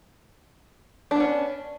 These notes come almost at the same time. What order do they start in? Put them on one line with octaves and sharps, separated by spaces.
D4 B3 C#4